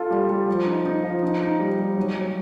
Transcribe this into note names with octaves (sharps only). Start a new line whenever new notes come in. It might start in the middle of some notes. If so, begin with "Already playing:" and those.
Already playing: F4 A4
G3
G3
F3
D#4
D#4
F3
D#4
D#4
G3
G3
F#3
F#3